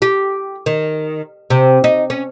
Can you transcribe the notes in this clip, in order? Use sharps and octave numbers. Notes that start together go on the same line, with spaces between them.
G4
D#3
C3
D#4
C#4